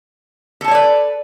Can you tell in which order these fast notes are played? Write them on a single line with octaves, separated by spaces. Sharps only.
A4 A5 C#5 D5 B4